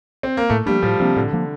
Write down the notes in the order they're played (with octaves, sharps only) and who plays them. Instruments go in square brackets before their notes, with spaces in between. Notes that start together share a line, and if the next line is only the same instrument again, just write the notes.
[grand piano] C4
A#3
[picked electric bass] A2 [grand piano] A3
[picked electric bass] F3 A#3 D4 [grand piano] G3
[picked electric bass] A2 [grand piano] F3
[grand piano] C3 [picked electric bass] F3 A#3 D4
[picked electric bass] A2 [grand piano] D3
[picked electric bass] F3 A#3 D4